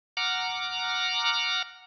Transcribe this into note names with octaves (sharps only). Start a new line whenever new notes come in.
F#5 A#5 D6 F6